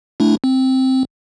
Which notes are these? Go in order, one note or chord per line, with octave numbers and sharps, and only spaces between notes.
A3 D4 E4
C4